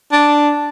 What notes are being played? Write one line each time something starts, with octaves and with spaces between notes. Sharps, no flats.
D4